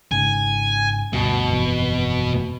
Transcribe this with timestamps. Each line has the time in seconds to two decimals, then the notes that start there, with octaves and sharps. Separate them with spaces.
0.11 G#1 G#2 C#3 G#5
1.13 D2 G2 B2
1.50 G1 F2 E3